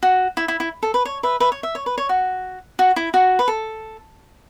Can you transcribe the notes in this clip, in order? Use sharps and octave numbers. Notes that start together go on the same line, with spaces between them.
F#4
E4
E4
E4
A4
B4
C#5
B4 E5
B4 E5
C#5
E5
C#5
B4
C#5
F#4
F#4
E4
F#4
B4
A4